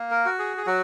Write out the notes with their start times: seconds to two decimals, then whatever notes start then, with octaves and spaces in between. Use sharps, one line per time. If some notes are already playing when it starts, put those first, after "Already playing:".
Already playing: A#3
0.11 A#4
0.25 F#4
0.39 G#4
0.57 G#4
0.66 F#3 F#4